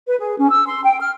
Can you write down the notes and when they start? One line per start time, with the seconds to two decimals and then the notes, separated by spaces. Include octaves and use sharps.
0.08 B4
0.21 G#4
0.38 C#4
0.51 E6
0.68 C6
0.84 G5
1.00 F6